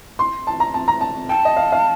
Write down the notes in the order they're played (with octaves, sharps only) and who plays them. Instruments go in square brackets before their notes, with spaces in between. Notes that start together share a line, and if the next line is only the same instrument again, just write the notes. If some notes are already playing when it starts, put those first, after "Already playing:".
[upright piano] C6
A5
A#5
A5
A#5
A5
[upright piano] G5 [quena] A5
[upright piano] D#5
F5
F5